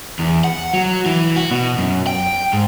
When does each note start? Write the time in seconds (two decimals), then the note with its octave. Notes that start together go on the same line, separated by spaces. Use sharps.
0.19 E2
0.44 F#5
0.74 F#3
1.06 E3
1.36 F#4
1.51 B2
1.78 F#2
2.07 G5
2.53 G#2